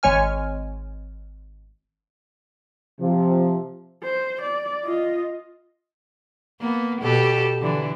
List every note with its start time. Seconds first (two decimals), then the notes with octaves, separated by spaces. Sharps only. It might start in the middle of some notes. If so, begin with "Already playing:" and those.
0.03 G#1 G#3 C#5 G#5 F6
3.01 C3 F3
4.03 C5
4.41 D5
4.85 F4 D#5
6.60 A#3 B3
7.01 B2 G4 A4
7.61 D3 E3